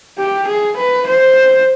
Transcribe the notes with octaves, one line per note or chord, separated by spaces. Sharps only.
G4
G#4
B4
C5